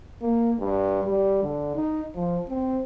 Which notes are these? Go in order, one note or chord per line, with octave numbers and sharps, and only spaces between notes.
A#3
G2
G3
D3
D#4
F3
C4